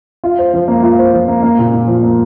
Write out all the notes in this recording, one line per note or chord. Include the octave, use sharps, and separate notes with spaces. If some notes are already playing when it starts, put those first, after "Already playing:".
F4
C5
F3
A#3
F4
C5
F3
A#3
A#3
A#2
A#2
F3
A#3